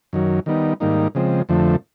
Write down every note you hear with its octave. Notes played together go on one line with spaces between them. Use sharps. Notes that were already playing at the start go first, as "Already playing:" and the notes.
F#2 D#3 F#3
D#3 G3 B3 D#4
G#2 D#3 G3 A#3 D#4
C#3 F3 G#3 C4
F2 D3 F3 A3